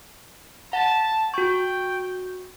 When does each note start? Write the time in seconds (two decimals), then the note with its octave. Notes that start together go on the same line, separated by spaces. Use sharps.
0.73 F#5 A5
1.34 F#4 G5 C#6